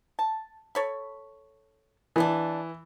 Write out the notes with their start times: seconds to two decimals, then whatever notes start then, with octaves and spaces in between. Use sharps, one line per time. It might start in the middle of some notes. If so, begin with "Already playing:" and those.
0.19 A5
0.75 A4 C#5 B5
2.16 C#3 E3 B3 D4